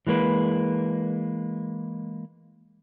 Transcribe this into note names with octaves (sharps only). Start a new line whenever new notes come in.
E3 G#3 A#3 B4